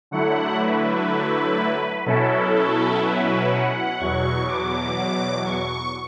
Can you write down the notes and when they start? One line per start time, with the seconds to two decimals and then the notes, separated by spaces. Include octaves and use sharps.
0.11 D3 F#3 A3 E4 F#5
0.60 B4
2.06 B2 F#3 C#4 E4 A4
2.54 A4
3.04 B4
3.52 F#5
3.99 E2 B2 F#3 C#6
4.48 D6
5.45 C#6